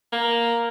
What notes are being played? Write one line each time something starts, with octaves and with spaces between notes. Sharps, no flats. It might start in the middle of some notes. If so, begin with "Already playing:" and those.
A#3